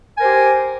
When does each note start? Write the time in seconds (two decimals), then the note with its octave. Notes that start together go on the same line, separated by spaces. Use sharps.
0.15 G#5
0.18 A#4
0.21 C5
0.24 G4